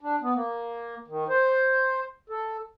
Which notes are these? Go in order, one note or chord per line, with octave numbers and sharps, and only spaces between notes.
D4
B3
A#3
D#3
C5
A4